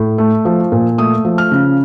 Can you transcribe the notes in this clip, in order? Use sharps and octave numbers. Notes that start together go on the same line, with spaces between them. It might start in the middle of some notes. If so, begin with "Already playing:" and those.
Already playing: A2
A3
F3
A#2
A3 D#6
F3
F6
C#3